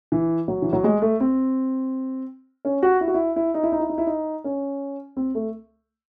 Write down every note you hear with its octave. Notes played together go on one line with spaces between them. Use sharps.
E3
F#3
E3
F#3
G#3
A3
C4
C#4
F#4
E4
F#4
E4
E4
D#4
E4
D#4
E4
D#4
E4
D#4
C#4
C4
A3